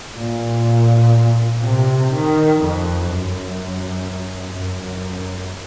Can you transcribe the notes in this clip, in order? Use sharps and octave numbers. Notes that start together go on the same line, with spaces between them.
A#2
C3
D#3
F2
F#2
F#2